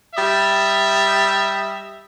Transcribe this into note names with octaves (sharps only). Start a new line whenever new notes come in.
G3 D#5 E5